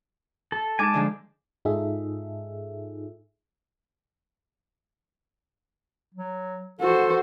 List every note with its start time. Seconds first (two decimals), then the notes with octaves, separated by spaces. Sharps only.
0.52 A4
0.79 G#3 D#4 G#5 A5 D6
0.94 D3 F3 G#3
1.65 G#2 D#4 F4 G#4 A4 E5
6.15 F#3
6.81 F#4 A4 C5